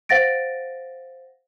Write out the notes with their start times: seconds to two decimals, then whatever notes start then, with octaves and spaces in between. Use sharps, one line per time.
0.09 C5 F5 F#5 A6 A#6 D7